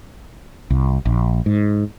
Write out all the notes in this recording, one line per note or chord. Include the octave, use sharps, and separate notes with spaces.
C2
A#1
G#2